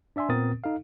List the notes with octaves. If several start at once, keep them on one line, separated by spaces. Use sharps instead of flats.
D4 D5 E5 G#5 C6
A#2 B3 C4 A#4 D#6 A6
D#4 A4 F5